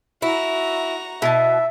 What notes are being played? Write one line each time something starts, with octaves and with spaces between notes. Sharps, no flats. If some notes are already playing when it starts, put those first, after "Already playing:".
E4 F#4 A#5
B2 E4 E5 A5